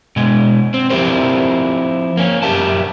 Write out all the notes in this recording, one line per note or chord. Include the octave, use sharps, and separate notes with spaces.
B2 G#3
C4
F3 C4 E4 G4 A#4 C5
A#3 C#4
F#2 G4 A#4 E5 A5